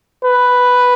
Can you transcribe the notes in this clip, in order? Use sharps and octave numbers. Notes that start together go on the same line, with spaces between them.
B4